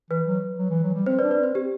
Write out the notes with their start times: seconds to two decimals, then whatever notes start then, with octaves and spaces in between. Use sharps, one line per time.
0.10 E3 B4
0.27 F#3
0.59 F#3
0.70 E3
0.83 F#3
0.94 G3
1.06 C4 C5
1.19 B4 D5
1.23 D4
1.31 B4 D5
1.39 C4 C5
1.55 C4 G4